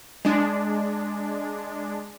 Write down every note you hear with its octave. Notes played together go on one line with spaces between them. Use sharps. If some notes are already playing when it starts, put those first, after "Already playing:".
G#3 D4